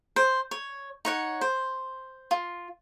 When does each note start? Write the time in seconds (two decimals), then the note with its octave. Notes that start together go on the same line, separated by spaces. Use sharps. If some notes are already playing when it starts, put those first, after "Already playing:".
0.16 C5
0.51 C#5
1.05 D#4 C#5 F#5
1.41 C5
2.31 F4